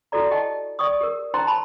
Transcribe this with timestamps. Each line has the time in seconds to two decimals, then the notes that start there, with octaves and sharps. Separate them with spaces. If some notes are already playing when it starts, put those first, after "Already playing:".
0.12 E4 F#4 A4 D5 A#5
0.31 G4 D#5 G5 A5
0.79 D5 G5 C#6 D#6
1.01 G4 A#4
1.34 D#4 C5 G5 A#5 C6
1.47 A5 B5 C6